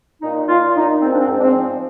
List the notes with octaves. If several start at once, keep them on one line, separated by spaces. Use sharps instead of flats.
A#2 D#4
A#2 F4
A#2 D#4
G#2 C4
D4
C4
G#2
D4
C4
F3